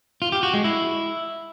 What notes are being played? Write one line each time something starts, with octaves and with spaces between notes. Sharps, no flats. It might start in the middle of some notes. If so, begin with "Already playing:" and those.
F4
G4
F#4
G#3
E4